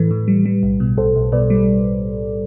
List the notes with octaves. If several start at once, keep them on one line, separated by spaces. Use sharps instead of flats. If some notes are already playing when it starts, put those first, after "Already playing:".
Already playing: A2 E3 A4 B4
A2
G3
G3
B1
B2
B1 A4 C5
B1
B2 B4 D5
G3